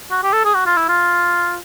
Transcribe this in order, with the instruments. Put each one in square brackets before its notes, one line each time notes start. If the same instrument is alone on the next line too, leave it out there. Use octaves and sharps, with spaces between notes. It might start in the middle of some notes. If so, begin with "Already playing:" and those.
[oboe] F#4
G4
A4
G#4
F#4
F4
E4
F4